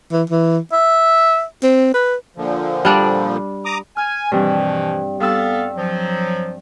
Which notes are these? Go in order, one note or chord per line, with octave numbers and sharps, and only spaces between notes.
E3
E3
E5
C4
B4
A#2 D3 F3
G3 D4 D5
A#5 D6 D#6
G#5 F6
G2 B2 E3 F3 C4
G2 B3 A4 F5 E6
F3 F#3